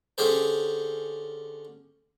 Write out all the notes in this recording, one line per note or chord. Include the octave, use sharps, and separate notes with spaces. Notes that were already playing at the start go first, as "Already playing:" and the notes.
D3 C#4 G4 G#4 C5